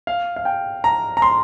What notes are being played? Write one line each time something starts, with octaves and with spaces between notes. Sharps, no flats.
F5
F5
G5
A#5
A#5
C6